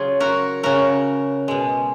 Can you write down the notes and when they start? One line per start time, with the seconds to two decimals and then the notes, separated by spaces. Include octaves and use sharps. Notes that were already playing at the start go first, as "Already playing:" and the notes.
Already playing: C#3 F#3 F4 G#4
0.20 F#4 A#4
0.63 C#3 F#3 F#4 A#4
1.48 B2 G#3